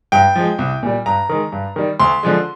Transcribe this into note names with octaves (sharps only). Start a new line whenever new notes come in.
G2 G5
F3 G#3
C2
A#2 G3
G2 A#5
D#3 G#3
G2
D#3 G3
D2 C6
D3 F3 G#3